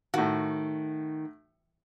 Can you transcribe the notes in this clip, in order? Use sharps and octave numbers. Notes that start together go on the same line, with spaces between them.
A2 D#3 F#4